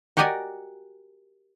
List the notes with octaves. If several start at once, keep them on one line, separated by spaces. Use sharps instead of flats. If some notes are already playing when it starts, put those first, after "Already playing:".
F#4 G4 A#4 D5 D#5 G#5